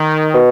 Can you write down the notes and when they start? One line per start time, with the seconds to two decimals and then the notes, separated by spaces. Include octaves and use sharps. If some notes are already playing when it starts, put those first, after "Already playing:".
Already playing: D#3
0.34 B2